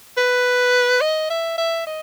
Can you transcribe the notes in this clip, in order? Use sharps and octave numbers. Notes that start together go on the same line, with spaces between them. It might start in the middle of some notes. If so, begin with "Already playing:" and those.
B4
D#5
E5
E5
D#5